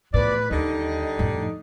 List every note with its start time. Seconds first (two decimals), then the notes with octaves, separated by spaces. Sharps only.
0.14 E2 A2 F3 B4 D5
0.51 D#2 D3 G3 D#4 D#5
1.19 F2 A2